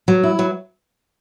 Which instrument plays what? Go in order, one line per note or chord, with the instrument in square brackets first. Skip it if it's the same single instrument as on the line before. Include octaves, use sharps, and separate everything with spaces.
[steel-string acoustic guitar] F#3
E4
F#3